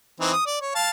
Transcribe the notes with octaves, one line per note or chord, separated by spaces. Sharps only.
E3 C4 D#4
D#6
D5
C#5
F5 A5